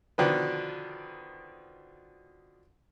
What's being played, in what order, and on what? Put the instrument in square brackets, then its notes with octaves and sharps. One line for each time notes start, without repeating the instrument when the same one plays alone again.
[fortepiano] B2 D3 D#3 F3 B4